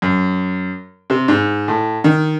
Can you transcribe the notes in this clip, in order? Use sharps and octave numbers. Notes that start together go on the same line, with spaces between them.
F#2
C3
G#2
A2
D#3